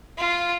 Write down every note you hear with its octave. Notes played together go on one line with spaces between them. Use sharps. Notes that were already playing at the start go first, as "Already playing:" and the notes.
F4